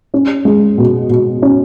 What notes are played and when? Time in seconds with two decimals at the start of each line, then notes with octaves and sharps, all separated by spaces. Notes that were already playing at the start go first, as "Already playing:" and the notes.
0.14 C#4
0.45 G#3
0.78 B2
1.10 B2
1.42 C#4